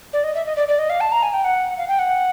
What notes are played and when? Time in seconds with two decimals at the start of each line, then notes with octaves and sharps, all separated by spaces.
0.13 D5
0.24 D#5
0.35 E5
0.46 D#5
0.56 D5
0.68 D5
0.79 D#5
0.90 F5
1.01 A5
1.12 A#5
1.23 G#5
1.34 G5
1.44 F#5
1.77 F5
1.88 G5
1.99 F#5